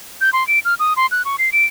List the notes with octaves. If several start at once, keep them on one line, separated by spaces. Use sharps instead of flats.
G6
C6
D7
F6
D#6
C6
F#6
C#6
C7
D7